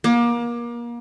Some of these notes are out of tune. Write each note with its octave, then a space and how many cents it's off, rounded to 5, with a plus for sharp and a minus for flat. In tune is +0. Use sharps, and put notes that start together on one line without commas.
A#3 +30